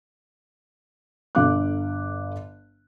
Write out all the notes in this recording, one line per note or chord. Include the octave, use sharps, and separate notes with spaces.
G1 D3 F5 D6 F#6